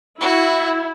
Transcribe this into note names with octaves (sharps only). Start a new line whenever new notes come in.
E4 F#4